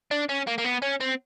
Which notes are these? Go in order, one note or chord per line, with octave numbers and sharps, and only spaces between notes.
D4
C#4
A#3
A#3
B3
C#4
C4